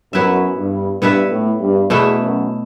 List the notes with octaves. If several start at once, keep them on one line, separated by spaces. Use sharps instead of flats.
F#2 B3 E4 B4 E5
G2
G2 B3 E4 B4 E5
A2
G2
E2 B2 A3 E4 B4
F#2